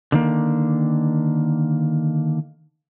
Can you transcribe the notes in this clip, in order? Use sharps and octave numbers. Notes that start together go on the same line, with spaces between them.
D3 D#3 A#3